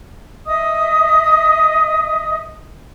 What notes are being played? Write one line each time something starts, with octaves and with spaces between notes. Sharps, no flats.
D#5 E5 D#6